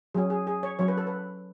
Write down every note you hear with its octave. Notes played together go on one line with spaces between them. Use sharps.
F#3 C#4 G#4
G#4
G#4
C#5
F#3 C#4 C#5
B4
A4
B4